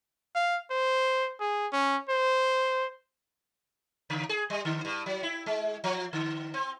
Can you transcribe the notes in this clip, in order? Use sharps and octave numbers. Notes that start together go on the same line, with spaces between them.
F5
C5
G#4
C#4
C5
C#3
G#4
G3
D3
G2
F#3
E4
G#3
F3
D3
C4